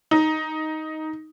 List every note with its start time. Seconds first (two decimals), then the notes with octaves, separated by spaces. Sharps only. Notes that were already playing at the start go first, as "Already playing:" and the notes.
0.11 D#4